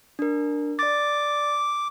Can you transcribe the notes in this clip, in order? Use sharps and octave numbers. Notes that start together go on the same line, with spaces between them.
D4 A#4
D5 D6 A6